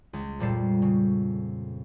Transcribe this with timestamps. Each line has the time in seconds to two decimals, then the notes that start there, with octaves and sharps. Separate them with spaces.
0.13 C#2
0.39 F2 A#2 G3 A4 C7
0.82 C#3